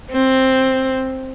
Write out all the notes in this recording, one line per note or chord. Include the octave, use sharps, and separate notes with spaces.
C4